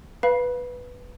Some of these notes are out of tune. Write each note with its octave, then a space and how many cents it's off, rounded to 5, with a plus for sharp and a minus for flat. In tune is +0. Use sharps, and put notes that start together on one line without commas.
B4 +0 F5 +0 B5 -30